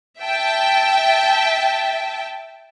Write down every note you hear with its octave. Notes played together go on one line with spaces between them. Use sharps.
E5 G5 A5